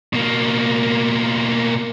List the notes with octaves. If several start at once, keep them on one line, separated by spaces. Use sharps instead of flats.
B2 A#3